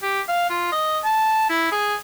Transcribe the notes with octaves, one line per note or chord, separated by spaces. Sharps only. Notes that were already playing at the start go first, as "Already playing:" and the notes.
G4
F5
F4
D#5
A5
E4
G#4